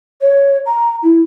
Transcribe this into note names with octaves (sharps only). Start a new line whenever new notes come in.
C#5
A#5
E4